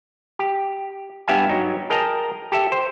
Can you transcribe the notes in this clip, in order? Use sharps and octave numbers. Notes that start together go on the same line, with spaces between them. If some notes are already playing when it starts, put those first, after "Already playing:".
G4
G2 B3 G4 E5 F5 G#5
F#3 D#4
G#4 A#4 D#5 G5 A5 A#5
G4 A4 E5
C5